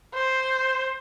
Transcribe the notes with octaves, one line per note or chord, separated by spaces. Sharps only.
C5